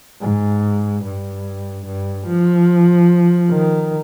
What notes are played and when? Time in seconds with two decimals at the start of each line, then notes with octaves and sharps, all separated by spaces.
0.21 G#2
1.03 G2
1.86 G2
2.26 F3
3.50 D#3